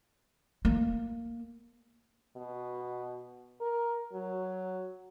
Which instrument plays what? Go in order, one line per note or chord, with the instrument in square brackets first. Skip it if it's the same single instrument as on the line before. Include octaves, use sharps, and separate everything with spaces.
[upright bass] A#3
[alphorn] B2
A#4
F#3